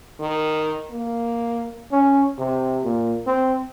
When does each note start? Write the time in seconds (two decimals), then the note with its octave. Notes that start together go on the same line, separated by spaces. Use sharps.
0.20 D#3
0.90 A#3
1.92 C#4
2.39 C3
2.84 A#2
3.27 C4